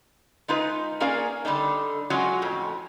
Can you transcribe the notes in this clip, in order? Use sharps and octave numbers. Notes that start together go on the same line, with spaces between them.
G#3 D#4 F4 B4
A#3 C#4 G#4 A#4 D5 F5
D3 G3 D4 D#4
F#3 G#3 C#4 F4 F#4
F2 A2